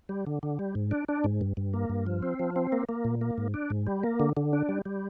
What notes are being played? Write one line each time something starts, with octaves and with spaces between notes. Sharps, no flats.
G3
D3
D3
G3
G#2
D4
D4
G#2
G2
G2
A#3
G2
F3
C4
F3
C4
A#3
A#3
A#2
A#3
G#2
D4
G#2
G3
A#3
D3
D3
D4
G3
G3